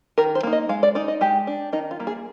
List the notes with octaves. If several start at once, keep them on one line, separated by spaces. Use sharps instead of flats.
D#3 A#4
C5
A#3 D#4
D#5
G#3 F5
D5
D#4 D5
D#5
G#3 G4
D4
D#3 D#4
F4
G3 A#3
G#4